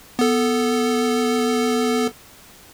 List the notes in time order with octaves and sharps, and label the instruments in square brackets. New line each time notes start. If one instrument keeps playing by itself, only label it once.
[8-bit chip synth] B3 A4